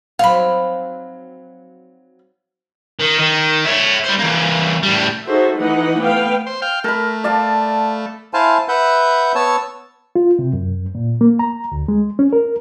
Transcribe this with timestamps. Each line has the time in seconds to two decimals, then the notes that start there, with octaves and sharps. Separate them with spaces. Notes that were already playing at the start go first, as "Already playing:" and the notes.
0.19 F#3 C4 D#4 F5 B5
2.99 D#3
3.19 D#3
3.66 C#5 E5
4.05 G3 C5
4.19 E3 A#3
4.83 A2 G3
5.25 D#4 F#4 G#4 A4 C5 E5
5.57 E3 A3 D#4 B4 F#5
6.00 A3 B3 B4 F5 G5
6.47 C5
6.62 F5 G5
6.84 A3 A#4 B5
7.24 D5 F5 A5
8.34 E4 C5 F5 G#5 A5
8.68 B4 E5 F#5 G6
9.35 B3 C#5 A5 E6
10.16 F4
10.39 C3
10.53 F#2
10.95 A#2
11.21 A#3
11.39 A#5
11.72 D2
11.88 G#3
12.19 C#4
12.33 A#4